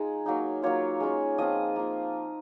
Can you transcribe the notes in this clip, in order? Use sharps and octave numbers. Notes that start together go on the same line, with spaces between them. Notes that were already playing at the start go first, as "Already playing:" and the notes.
Already playing: G#3 D#4 F4 G#4
F#3 A#3 D#4
F#3 A#3 F4 C#5
G#3 C#4 F4
F3 C4 F4 D#5
A#3 F4